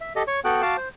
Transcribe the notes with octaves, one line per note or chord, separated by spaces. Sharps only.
E5
G4 A4 D#5
C#5 C#6
B3 F#4 A4 G5 F#6
F#4 F5 A5 D6
C5